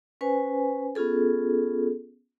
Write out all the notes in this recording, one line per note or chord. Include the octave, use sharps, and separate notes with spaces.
C#4 B4 C5 G#5
B3 C#4 F4 G#4 A4